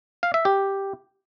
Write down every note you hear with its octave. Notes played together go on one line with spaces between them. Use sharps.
F5
E5
G4